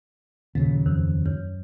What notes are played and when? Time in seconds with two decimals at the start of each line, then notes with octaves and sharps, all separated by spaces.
0.55 D#2 A#2 C#3 F#3
0.86 F2
1.26 F#2